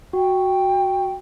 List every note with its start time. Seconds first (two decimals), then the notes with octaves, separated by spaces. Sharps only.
0.13 F#4 G5